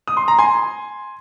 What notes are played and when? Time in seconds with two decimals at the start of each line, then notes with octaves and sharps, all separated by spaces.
0.08 D#6
0.17 C6
0.28 A#5
0.39 G#5 C6